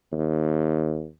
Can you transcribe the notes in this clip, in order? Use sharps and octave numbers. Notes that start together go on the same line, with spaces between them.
D#2